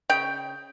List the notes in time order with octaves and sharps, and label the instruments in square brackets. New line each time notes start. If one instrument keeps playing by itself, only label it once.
[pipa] C#3 G5